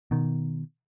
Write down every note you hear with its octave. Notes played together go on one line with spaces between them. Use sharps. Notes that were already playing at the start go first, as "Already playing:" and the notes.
B2 D#3